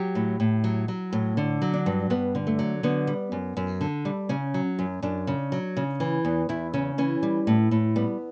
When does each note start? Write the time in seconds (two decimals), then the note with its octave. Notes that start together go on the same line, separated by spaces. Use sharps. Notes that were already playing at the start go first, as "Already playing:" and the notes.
Already playing: F#3 G4
0.15 A2
0.40 A2
0.64 F#3
0.88 F#3
1.13 A2
1.37 D3
1.62 F#3
1.74 D4
1.86 G2
2.10 G2 B3
2.35 D3
2.47 A3
2.59 F#3
2.83 D3 B3
3.07 G3
3.32 F#2
3.57 F#2
3.81 D3
4.05 G3
4.29 C#3 C#4
4.54 F#3
4.79 F#2
5.02 F#2 D4
5.27 C#3
5.52 F#3
5.77 C#3
6.00 E3
6.25 E2
6.49 E2 E4
6.74 C#3 C#4
6.98 E3 C#4
7.23 G3
7.47 A2
7.71 A2
7.96 G3 B3